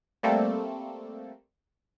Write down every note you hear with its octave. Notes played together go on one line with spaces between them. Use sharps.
G3 A3 A#3 C4 A4